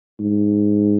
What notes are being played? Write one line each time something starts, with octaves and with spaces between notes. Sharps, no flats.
G#2